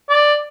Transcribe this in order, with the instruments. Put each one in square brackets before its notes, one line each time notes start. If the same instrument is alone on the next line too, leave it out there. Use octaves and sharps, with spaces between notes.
[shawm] D5